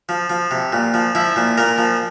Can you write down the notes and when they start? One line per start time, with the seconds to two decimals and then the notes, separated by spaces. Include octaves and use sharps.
0.09 F3
0.30 F3
0.51 C3
0.73 A#2
0.94 F3
1.15 F3 E4
1.36 A#2
1.58 A#2 A#4
1.78 F3